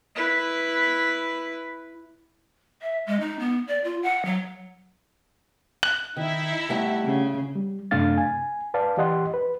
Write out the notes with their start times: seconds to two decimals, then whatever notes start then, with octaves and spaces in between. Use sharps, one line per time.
0.16 E4 B4
2.82 E5
3.07 G#3
3.20 D#4
3.39 B3
3.68 D5
3.84 F4
4.03 F#5
4.25 F#3
5.83 F#6
6.17 D#3 D#4 E4 E5
6.69 G3 A3 F#5
7.05 C#3
7.56 G3
7.91 F#2 C3 A3 D4 F5 A6
8.18 G#5
8.74 B4 D5 F5 A5
8.97 E3 G4 D#5 F#5 C6
9.34 B4